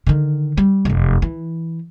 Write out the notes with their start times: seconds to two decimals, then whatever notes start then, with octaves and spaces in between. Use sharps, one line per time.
0.07 D3 D#3
0.57 G3
0.85 F1 F#2
1.22 E3